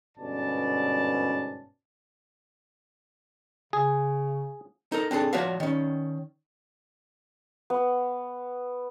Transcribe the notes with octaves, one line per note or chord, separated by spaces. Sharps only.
G1 G#2 B2 C#4 D5 A5
C#3 G#4
D#4 A4 A#4
C4 D4 G#4 A4
F3 F#4 C#5 D5 E5 F5
D#3 C#4
B3